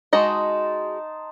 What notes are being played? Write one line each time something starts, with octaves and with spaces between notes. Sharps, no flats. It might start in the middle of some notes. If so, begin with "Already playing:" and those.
G#3 D#4 F#4 D#5 A5 C6